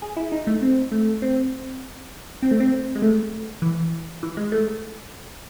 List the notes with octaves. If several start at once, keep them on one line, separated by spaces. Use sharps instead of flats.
G#4
E4
D#4
A3
C4
A3
C4
C4
A3
C4
G#3
A3
E3
E3
G#3
A3